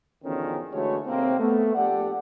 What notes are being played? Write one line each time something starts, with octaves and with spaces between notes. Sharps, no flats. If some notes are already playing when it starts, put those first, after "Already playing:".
E2 B2 D3 D#3 F3 C#4
D3 E3 G#3 A3 F#4 C#5
C3 D#3 A3 A#3 C4
A3 B3
A#1 G4 A4 D5 F#5